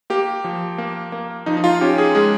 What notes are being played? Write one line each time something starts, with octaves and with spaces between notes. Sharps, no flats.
A#3 G4
F3
A#3
A#3
F3 D#4
D#4
F4
C#4 G4
G#4
G#3 G#4